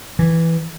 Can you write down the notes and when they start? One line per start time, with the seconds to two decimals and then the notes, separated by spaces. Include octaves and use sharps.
0.19 E3